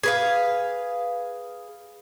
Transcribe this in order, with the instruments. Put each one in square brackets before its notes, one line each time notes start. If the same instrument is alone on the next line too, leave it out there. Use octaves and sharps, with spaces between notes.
[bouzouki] G#4 B4 F5